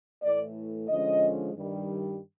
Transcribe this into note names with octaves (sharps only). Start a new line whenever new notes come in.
A2 E3 A3 D5
D3 F3 G#3 C#4 D#5
G2 D#3 G3